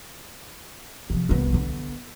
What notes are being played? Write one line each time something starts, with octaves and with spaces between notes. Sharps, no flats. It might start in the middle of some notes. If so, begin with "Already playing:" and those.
C3 F3
C2 B3
D3 B3